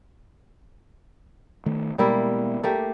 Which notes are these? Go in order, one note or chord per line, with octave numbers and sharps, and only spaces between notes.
D#3 A3
B2 G3 G#3 A#3 B3 E4
A3 A#3 G4